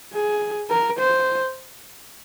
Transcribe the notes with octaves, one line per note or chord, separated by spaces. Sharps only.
G#4
A#4
C5